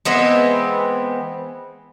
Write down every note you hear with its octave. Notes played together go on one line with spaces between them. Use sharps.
E3 G#3 B3 C4